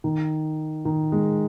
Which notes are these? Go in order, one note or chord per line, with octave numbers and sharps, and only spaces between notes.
D#3
D#3
G#3